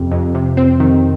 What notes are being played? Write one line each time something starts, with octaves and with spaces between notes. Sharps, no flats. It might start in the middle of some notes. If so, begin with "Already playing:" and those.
Already playing: F2 C3
F2
C3
C4
D#3